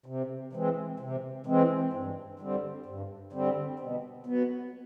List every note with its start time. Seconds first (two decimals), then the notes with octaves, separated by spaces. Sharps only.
0.06 C3
0.53 E3 G#3 C4
1.00 C3
1.46 E3 G#3 C4
1.93 G2
2.39 D3 G3 C4
2.86 G2
3.33 D3 G3 C4
3.79 B2
4.26 F#3 B3